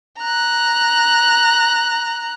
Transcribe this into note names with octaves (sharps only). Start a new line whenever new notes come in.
A#5 F#6